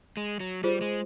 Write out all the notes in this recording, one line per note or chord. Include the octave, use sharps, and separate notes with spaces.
G#3
F#3
G3 F4 G#4 C5
G#3